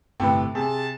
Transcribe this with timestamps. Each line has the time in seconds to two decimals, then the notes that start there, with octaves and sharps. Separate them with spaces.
0.20 G1 A2 C3 A4 B4 G5
0.55 C3 G#4 A5